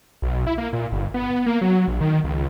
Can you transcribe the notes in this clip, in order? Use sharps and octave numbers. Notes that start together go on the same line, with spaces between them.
B1
E4
A#3
A#2
G1
B3
A#3
F#3
A#1
D#3
C#2